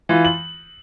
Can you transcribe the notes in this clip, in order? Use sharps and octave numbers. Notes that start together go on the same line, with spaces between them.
E3 F4
F#7